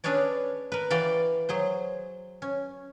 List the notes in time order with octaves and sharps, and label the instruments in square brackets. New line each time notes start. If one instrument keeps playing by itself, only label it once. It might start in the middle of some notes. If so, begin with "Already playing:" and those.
[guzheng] C#4 D4 G#4 B4 C#5 D5
A#4 B4
E3 F#4 D5 F5 G5
F#3 G#4 C5
C#4